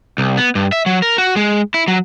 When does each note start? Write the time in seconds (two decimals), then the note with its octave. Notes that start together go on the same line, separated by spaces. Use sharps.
0.18 C2
0.37 B3
0.55 G2
0.72 E5
0.86 F#3
1.02 A#4
1.18 F#4
1.36 G#3
1.74 E4
1.88 F#3